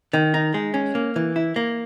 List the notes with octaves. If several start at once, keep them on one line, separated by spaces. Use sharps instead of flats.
D#3
D#4
G#3
C#4
A#3
E3
E4
A#3